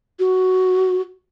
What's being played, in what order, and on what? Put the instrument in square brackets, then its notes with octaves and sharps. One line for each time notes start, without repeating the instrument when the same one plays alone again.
[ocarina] F#4